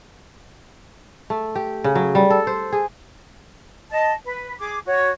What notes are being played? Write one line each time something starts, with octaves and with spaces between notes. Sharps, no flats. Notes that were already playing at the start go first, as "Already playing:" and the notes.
A3
G4
C#3
F#3
G3
A4
C5
G#4
D#5 A5
B4
G#4 D6
F#4 C#5